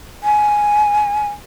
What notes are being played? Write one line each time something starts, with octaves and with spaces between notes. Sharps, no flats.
G#5